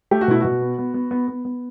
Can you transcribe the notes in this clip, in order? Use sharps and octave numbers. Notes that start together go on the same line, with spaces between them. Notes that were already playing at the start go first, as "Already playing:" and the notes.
A3 G4
F#4
B2 E4
B2 F#4
B3
B3
B3
B3
B3
B3